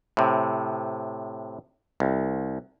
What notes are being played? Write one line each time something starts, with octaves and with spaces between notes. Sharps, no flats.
A2 C3
C2